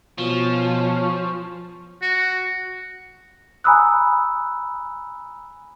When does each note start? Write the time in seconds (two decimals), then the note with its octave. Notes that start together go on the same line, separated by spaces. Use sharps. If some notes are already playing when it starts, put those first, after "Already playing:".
0.19 B2 F3 C#4
2.02 F#4
3.64 G#5 A#5 B5 D#6 E6 F#6